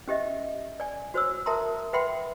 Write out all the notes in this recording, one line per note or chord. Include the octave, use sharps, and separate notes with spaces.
C#4 G4 D#5 E5
D5 G#5
F#4 C5 C#5 E6
A#4 E5 A5 A#5 C6
B4 E5 F#5 G5 B5 C6